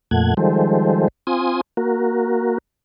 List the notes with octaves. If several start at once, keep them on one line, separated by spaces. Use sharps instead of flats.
F2 A#2 A3 F#5 G#6
D#3 F3 G3 G#3 A4 C5
C4 F4 G#5 C6 D#6
A#3 F#4 A#4